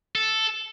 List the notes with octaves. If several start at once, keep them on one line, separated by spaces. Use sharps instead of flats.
A4